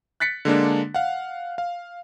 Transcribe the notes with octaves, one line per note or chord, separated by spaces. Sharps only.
F#6 A6 B6 C#7
D3 G#3 A#3 D4
F5 F#5
F5